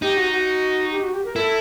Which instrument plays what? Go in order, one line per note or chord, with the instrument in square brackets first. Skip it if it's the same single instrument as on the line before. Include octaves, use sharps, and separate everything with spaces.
[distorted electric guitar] D#4 [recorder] G4
[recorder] F#4
F#4
G4
F#4
G4
A#4
[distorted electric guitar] E4 [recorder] A4